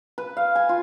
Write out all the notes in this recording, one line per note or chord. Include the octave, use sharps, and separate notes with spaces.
B4
F5
G#5
F4